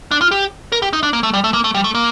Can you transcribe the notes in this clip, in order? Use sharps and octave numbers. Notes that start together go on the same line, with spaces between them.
D4
F4
G4
A#4
G4
D#4
D4
A#3
A3
G3
A3
A#3
A3
G3
A3
A#3